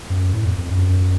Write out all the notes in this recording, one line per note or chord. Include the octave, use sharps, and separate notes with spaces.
F#2
A2
F2
F2
F#2